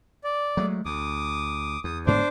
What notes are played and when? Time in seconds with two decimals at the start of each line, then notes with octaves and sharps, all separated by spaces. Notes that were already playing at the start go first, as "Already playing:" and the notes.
0.24 D5
0.57 F#3 G#3 A3
0.85 D2 D6 D#6
1.84 E2 D#6
2.07 G1 G#2 B3 D4 C5 D6